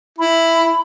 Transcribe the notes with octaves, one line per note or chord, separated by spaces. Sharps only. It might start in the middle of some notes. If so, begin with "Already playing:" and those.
E4 B5